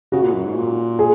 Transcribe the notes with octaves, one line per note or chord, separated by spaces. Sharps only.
C#3 F#4
A#2
F#2
G#2
A#2
G#4